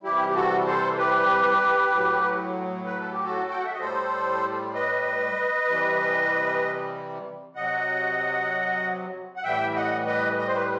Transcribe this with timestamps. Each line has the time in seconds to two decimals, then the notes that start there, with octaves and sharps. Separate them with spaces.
0.03 C3 E3 G3 E4 G4
0.29 G4
0.35 F#4 A4
0.66 A4 C5
0.98 G4 B4
1.92 A2 F#3
2.86 B4
2.99 A4
3.12 G4
3.24 F#4 A4
3.51 G5
3.59 F#5
3.66 E5
3.73 D#5
3.79 A2 G3 A4 C5
4.74 B4 D#5
5.67 C3 E3 G3
7.55 C3 F#3 D#5 F#5
9.36 F#5
9.43 A2 E3 G3 E5 G5
9.75 D#5 F#5
10.07 B4 D#5
10.39 D#5
10.48 C5
10.55 B4